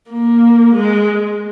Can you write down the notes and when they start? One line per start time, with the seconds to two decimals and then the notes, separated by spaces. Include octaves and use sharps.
0.11 A#3
0.74 G#3